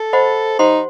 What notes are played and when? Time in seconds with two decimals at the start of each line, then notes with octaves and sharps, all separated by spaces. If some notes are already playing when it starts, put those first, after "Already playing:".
Already playing: A4
0.13 C5 D#5 F#5 B5
0.59 D#4 G4 C5 F#5 C6